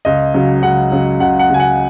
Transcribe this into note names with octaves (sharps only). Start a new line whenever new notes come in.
C#2 D#5
C#3 F#3
C#2 F#5
C#3 F#3
C#2 F#5
F#5
C#3 F#3 G#5
F#5